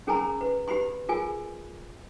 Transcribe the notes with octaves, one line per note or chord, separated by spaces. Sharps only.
C#4 G#4 A#4 G#5 A#5 B5
B4
G4 B4 B5 C6
F4 G#4 A#4 G#5